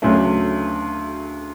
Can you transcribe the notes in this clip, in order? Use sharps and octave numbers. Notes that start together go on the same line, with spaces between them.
D2 C#3 F#3 A3 C#4